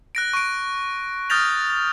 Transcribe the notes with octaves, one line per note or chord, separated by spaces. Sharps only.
F#6 A#6 D7
C#6 D7
D#6 F6 G6 A6 A#6 F7